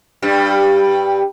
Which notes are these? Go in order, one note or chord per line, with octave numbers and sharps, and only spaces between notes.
G2 G3